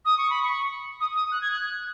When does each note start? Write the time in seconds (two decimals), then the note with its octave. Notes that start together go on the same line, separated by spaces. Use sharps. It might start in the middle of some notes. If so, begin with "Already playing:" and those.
0.04 D#6
0.17 C#6
0.29 B5
0.42 C#6
1.00 D#6
1.15 D#6
1.31 F#6
1.41 G#6
1.51 F#6